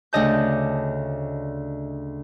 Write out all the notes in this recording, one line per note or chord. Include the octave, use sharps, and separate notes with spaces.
D2 C#3 D4 D#5 A5 G6